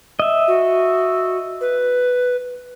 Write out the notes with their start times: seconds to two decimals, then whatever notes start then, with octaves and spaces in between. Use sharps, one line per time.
0.20 D#5 E5
0.48 F#4
1.61 B4